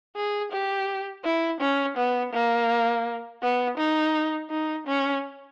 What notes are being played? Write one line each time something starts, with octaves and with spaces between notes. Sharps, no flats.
G#4
G4
E4
C#4
B3
A#3
B3
D#4
D#4
C#4